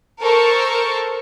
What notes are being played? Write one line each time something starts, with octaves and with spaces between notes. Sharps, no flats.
A4 A#4 C5 C#6